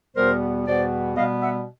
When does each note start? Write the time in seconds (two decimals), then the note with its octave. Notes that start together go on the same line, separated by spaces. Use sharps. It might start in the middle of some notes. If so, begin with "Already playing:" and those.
0.16 E2 B2 G3 B3 A#4 C5
0.66 E2 B2 G3 B3 C5 D5
1.16 B2 G3 B3 D#5 F5
1.41 E5 F#5